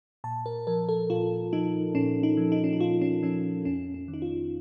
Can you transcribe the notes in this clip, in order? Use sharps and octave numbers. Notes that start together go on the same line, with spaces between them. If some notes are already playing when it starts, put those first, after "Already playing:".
A#2 A5
A#4
F3 A#4
A4
A#2 F4
F3 D#4
A#2 C#4
D#4
F3
D#4
C#4
D#4
A#2 F4
C#4
F3 C#4
F2 C#4
C#4
D#3
D#4
F4